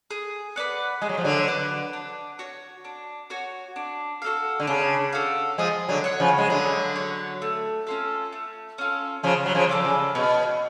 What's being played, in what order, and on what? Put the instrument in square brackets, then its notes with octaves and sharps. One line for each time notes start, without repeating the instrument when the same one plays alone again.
[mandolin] G#4
B4 D5 F#5
[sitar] G#3 [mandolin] G#4
[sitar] F#3
F3
D3 F#3
[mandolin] B4 D5 F#5
D4
F#4 C#5
D4
F#4 C#5
D4
F#4 A4 F5
[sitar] D3
[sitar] C#3 [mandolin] D4
[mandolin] F#4 A4 F5
[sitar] F3 G#3 [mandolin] G#4
[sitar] D3 F#3
[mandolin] C#5 F#5
[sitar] C#3 F3
G#3
[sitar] D3 F#3 [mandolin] G#4
[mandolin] C#5 F#5
A3
C#4 F4 A4
A3
C#4 F4 A4
[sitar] C#3 F3 [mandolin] C#4
[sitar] F#3
C#3 F3
[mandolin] F4 A4 D5
[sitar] C#3
[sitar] B2 [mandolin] C#4